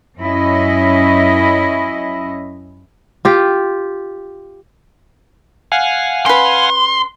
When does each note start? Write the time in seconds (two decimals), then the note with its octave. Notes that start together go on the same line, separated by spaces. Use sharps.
0.19 F#2 C#4 E4 D#5
3.25 F4 G4
5.72 F5 F#5 G#5
6.26 C#4 B4 C6